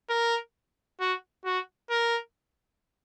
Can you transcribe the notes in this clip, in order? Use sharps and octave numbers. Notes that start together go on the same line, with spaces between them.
A#4
F#4
F#4
A#4